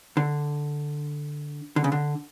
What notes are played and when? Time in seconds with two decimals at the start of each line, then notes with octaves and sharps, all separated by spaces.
0.17 D3
1.76 D3
1.84 C#3
1.92 D3